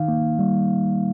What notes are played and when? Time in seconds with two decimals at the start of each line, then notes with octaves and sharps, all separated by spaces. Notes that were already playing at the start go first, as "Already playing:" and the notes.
Already playing: D#3 D#4 F5
0.08 A#3
0.39 G3